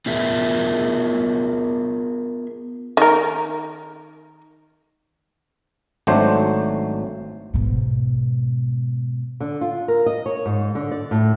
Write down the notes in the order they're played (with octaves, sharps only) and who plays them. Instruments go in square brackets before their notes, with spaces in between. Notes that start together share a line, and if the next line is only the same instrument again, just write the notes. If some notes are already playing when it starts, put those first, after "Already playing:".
[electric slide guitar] B3 F4 G#4 A#4 E5
[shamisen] D#3 A#4
[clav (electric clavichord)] G#1 F#3 A3 D4 C5
[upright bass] G#2 B2
[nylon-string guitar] D3
F4
A#4
D#5
C#5
G#2
D3
D5
A2